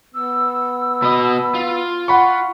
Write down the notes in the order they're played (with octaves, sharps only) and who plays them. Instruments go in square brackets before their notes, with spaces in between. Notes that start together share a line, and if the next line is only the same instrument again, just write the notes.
[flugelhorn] B3 [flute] E6
[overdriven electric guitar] B2 D#5 [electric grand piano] B5
[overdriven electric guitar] F4
[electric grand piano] F#5 B5 C#6